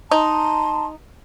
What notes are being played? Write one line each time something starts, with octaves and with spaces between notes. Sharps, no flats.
D#4 A5 A#5 C6